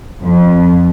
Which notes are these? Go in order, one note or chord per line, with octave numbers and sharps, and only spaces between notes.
F2